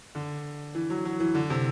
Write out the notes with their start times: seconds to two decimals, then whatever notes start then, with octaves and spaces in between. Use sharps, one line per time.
0.15 D3
0.75 E3
0.90 F#3
1.05 F#3
1.20 E3
1.34 D3
1.50 C3